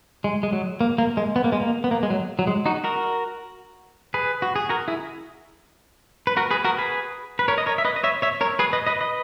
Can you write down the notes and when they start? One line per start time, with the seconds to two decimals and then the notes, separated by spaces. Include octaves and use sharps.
0.24 G#3
0.43 G#3
0.53 F#3
0.81 A#3
0.98 A#3
1.17 G#3
1.36 B3
1.44 A#3
1.52 G#3
1.60 A#3
1.84 B3
1.91 A#3
2.03 G#3
2.10 F#3
2.39 F#3
2.47 G#3
2.66 D#4 F#4
2.84 F#4 A#4
4.14 G#4 B4
4.42 F#4
4.56 G#4
4.69 F#4 A#4
4.88 E4 G#4
6.27 B4
6.37 F#4 A#4
6.51 G#4 B4
6.64 F#4 A#4
6.78 G#4 B4
7.39 B4
7.48 A#4 C#5
7.58 D#5
7.66 A#4 C#5
7.78 E5
7.85 B4 D#5
7.96 D#5
8.04 C#5 E5
8.22 C#5 E5
8.41 A#4 C#5
8.59 G#4 B4
8.73 B4 D#5
8.87 B4 D#5
9.01 B4 D#5